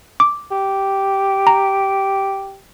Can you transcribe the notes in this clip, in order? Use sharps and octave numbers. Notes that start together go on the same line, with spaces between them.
D6
G4
A#5